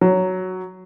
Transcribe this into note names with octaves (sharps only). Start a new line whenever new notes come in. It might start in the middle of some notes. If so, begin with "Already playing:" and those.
F#3